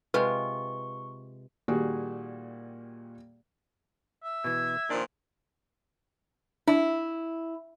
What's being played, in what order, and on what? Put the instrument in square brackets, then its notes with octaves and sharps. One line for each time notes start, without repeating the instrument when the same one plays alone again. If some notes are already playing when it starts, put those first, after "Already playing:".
[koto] C3 G#3 F4 [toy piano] B4 [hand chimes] C#6
[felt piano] A#2 D#3 G3 F#4 G#4
[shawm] E5
[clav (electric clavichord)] B2 E3 [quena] G#6
[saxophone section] A#2 D#3 F3 [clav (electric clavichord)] D4
[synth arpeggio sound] D4 [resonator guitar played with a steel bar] E4